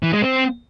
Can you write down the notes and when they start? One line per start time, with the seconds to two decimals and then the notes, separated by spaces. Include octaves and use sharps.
0.03 E3
0.13 G#3
0.23 C4